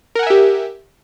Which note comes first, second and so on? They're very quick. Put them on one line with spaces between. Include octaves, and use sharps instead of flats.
A#4 F#5 G#5 E5 G4